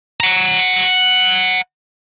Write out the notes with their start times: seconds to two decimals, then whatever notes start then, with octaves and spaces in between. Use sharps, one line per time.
0.20 F#5 A#5